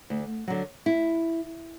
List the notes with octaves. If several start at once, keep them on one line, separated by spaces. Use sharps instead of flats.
D2
D3 F#3
E4